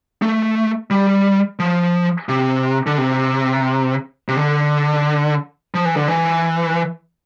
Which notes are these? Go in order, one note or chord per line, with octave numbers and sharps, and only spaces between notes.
A3
G3
F3
C3
D3
C3
C3
D3
F3
E3
D3
E3